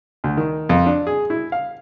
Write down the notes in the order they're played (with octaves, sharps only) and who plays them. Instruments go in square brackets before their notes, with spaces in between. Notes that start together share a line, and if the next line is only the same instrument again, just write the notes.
[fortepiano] D2
D#3
F2
D4
G#4
E4
F5